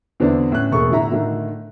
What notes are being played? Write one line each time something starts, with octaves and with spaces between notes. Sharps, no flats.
E2 D3 B3 C4 D4 E4
A2 C#4 F#6
E1 A3 A#3 G#4 C#6
A2 D3 E4 E5 A#5
A2 D3 D#3 A3